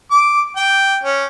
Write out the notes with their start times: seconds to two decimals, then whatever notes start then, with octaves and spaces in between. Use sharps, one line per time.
0.11 D6
0.56 G5
1.03 C#4